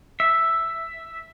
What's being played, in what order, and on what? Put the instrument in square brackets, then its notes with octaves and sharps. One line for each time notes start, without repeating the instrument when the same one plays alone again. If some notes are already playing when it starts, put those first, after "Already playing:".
[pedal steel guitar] E5